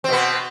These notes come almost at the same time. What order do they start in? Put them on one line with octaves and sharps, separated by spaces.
C4 B2 B3